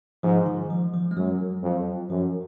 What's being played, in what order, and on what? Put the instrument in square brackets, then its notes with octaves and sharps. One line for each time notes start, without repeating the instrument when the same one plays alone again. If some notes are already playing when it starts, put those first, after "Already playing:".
[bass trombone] G#2 [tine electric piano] F3
[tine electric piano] D#3
F3
F3
G#3
[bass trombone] F#2 [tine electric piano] F#3
[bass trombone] F2
[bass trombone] F#2 [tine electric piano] F3